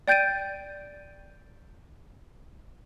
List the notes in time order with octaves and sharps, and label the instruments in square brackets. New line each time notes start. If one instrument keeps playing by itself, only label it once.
[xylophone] D5 G5 G6 A6 D7 D#7